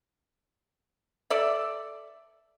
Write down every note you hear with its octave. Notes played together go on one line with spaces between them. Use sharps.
A4 D5 E5